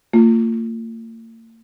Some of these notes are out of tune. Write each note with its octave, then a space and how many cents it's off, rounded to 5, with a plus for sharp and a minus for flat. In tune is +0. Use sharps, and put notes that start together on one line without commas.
A#3 -45 F4 +0